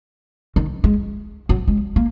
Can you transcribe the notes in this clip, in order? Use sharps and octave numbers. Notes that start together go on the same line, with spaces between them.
D#3
G#3
F#3
G#3
A#3